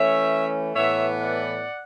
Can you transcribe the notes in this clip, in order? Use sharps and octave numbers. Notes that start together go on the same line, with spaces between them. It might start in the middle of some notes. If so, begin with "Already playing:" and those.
Already playing: E3 A3 C#4 C#5 E5
A2 E3 B3 C#5 E5
D5 F#5